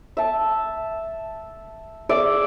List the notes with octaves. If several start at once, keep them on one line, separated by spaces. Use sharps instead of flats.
E5 A5
G#4 D5 E5 D6